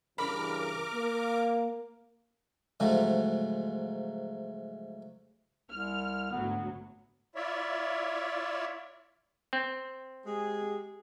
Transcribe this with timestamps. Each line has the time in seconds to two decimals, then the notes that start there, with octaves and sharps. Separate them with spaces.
0.18 G2 C#3 E3 A#4 B5 D6 F6
0.92 A#3
2.80 G#2 C#3 F3 F#3 A3
5.70 C2 F6
6.31 G#1 D2 F#3 B3
7.35 E4 F4 C#5 D5 E5
9.53 C4
10.26 G#3 G4 G#4